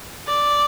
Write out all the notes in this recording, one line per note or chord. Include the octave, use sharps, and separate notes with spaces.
D5